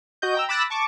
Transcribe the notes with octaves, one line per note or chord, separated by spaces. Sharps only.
F#4 D#5 G6
G5 A#5 E6
B5 D6 E6 F#6 A6 A#6
A5 C#6 D6